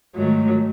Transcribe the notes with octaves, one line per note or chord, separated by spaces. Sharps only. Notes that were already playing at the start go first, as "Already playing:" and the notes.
G#2 D#3 F#3 A3